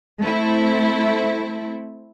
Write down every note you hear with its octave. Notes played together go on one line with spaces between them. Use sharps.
A3 C4 E4